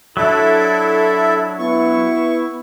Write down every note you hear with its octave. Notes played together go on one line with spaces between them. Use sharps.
F#3 D4 E4 A4 E5
B3 E4 C#6